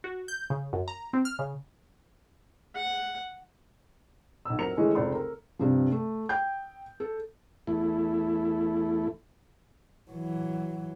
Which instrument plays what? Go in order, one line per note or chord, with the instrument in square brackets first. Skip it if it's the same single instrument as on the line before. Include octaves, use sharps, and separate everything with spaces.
[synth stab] F#4
G6
C#3
F#2
A#5
C4
F6
C#3
[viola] F#5
[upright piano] B1 E6
F2 F#3 A#4 A#5 C#7 F7
D#3 E3 G#3 A3 C#4 D#4
F1 C#2 C#3 D5 C6
A#4
[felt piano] G2 C3 F3
A3
G5 G6
A4
[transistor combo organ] E2 A3 E4
[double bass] E3 F#3